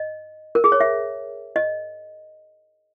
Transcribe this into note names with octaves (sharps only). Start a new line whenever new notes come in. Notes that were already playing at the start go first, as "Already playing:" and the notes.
Already playing: D#5
A#4
G#4
C#5
E5
D#5